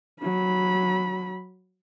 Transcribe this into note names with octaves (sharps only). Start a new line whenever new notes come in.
F#3 B5